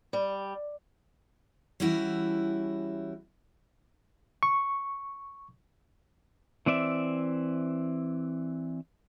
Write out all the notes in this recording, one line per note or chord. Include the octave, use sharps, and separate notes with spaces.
G3
E3 G3 C#4 E4 F#4
C#6
E3 C4 D5 E5